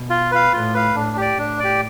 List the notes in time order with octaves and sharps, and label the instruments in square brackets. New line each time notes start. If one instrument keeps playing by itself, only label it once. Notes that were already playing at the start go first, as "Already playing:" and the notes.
Already playing: [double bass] B2
[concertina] F4
B4 F5
[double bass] A2 [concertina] F4
[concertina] B4 F5
[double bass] A2 [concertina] D4
[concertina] G4 D5
[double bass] A2 [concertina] D4
[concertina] G4 D5